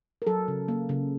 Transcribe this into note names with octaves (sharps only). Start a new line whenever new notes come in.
A#4
F#3 A4
C#3
A#3
C#3